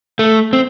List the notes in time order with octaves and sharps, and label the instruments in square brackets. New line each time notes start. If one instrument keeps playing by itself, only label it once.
[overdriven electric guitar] A3
C4